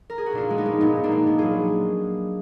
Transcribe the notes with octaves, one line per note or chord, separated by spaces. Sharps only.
A#4
G#4
F#4
A#2 D4 F4
G#3
B3 D#4
G#3
A#2 B3 D#4
A#2
A#3 D4
G#3
A#2 B3
F#3 F4 G#4